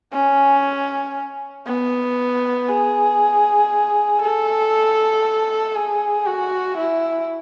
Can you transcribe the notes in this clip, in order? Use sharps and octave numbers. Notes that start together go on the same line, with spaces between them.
C#4
B3
G#4
A4
G#4
F#4
E4